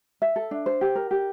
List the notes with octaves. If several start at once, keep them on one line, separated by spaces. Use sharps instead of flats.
E5
A4
D4
C5
G4
A#4
G4